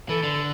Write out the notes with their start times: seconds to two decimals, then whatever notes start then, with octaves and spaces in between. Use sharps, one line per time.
0.09 E3 A4
0.23 D3